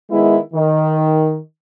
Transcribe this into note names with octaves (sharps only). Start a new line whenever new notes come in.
D#3 G#3 B3 E4
D#3